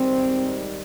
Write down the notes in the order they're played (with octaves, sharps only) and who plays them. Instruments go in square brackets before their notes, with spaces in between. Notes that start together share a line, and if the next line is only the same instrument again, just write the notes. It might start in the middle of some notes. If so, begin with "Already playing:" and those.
Already playing: [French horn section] G#2 D#3 G3 C4